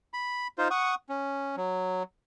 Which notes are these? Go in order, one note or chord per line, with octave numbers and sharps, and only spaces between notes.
B5
D#4 F4 C5
F#5 C#6 D#6
C#4
F#3